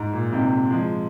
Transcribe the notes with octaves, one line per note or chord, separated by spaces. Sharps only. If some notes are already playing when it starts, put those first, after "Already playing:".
Already playing: G#2
A#2
G#2 C3
F3 G#3